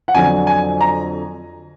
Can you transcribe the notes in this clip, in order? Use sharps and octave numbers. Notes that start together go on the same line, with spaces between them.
F#5
F2 D3 F#3 G#5
G#5
A#5